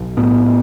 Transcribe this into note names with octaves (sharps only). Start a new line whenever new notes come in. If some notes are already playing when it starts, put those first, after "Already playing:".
Already playing: B1
A2 B3